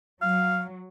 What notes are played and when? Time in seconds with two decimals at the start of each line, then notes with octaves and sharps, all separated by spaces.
0.22 F#3 F5